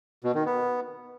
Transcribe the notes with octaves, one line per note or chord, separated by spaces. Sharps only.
B2
D#3
B3